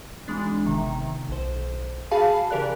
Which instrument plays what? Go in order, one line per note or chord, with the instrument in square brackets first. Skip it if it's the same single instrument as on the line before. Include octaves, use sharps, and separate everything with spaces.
[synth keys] G#1 E3 G#3 D4
G1 C3 D#3
B1 C5
F#4 G#4 F5 A5 B5
C#3 E3 G4 A#4 D5 F#6